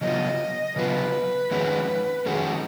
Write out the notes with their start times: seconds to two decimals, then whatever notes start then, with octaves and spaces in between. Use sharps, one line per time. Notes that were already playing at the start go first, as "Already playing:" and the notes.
0.01 C#3 F#3 B3 F4 D#5
0.76 C#3 F#3 B3 F4 B4
1.51 F2 D#3 G#3 C#4 F#4
2.26 F2 D#3 G#3 C#4 F#4 G#4
2.52 D#4